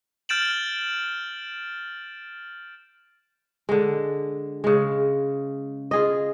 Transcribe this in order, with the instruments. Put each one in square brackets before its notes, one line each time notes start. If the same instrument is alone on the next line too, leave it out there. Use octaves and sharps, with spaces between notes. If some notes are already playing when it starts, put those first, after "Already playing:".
[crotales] F6 G6 A6 D7 E7 F#7
[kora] D3 G#3
C#3 G#3
F4 G#4 D#5